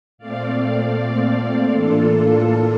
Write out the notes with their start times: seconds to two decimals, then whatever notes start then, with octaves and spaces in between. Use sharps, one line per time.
0.18 A#2 A3 C4 D5 F5
0.96 D5 F5
1.72 A2 E3 A#3 D4 F4 A4